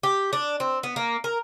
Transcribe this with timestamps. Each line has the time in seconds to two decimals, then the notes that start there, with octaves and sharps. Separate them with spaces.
0.03 G4
0.33 D4
0.60 C4
0.83 B3
0.96 A#3
1.24 A#4